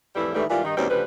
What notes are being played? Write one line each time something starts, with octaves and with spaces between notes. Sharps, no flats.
F2 A2 E3 G3 E4
G#2 D#3 E3 G3 A3
G#2 E3 G3 A#3 F4
G2 D#3 D#4
D#2 G#2 B2 G3 C4 C#4
D2 C#3 F3 G3 B4